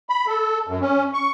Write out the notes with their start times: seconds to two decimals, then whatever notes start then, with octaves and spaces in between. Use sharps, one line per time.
0.09 B5
0.27 A4
0.67 F#2
0.81 C#4
1.14 C#6